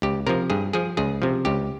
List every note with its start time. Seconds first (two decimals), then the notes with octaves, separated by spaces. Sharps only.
0.02 C#2 G4
0.27 C3 F3 A#4
0.50 G2 G#4
0.73 F3 G#4
0.97 C#2 G#4
1.22 C3 F3
1.45 C#2 G4